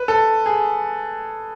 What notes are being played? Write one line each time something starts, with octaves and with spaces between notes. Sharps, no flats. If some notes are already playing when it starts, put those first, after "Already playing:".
Already playing: B4
A4
G#4